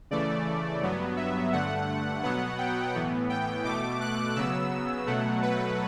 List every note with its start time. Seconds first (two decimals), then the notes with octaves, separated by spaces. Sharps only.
0.11 C#3 E3 A3 D5
0.81 G2 F#3 B3
1.17 E5
1.52 G2 D3 A3 F#5
2.23 B2 F#3 B3 F#5
2.59 G5
2.95 A2 E3 B3
3.30 G5
3.65 B2 A3 D6
4.01 F#6
4.36 C#3 F#3 B3 E6
5.07 B2 F#3 A3 F#5
5.42 B4